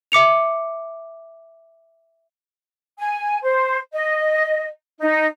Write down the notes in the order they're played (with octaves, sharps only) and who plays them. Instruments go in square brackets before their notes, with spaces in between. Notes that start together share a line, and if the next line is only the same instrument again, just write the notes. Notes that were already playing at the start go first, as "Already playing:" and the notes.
[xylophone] E5 D6 C#7 F7
[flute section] G#5
C5
D#5
D#4